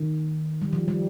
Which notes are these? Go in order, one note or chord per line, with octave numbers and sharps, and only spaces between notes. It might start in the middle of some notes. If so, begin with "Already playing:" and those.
Already playing: D#3
G3
F3
G3